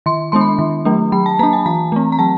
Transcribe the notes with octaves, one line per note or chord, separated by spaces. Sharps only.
D#3 C6
G#3 B3 D4 C6
B5
D#3
F#3 A3 D4
F#3 B5
A5
A#3 D4 A#5
G#5
E3 A#5
A3 C4
A#5
F#3 A5